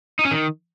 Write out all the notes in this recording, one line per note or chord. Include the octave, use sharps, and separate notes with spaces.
D#4
C#4
D#3